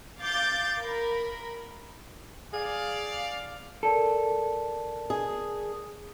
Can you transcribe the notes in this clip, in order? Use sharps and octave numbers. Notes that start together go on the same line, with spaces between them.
F5 D6 G6 A6
A#4 B5
G#4 D5 F5
A4 A#4 D5 A5
G#4